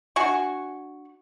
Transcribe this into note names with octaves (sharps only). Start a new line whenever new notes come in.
D4 F#4 G#5 C#6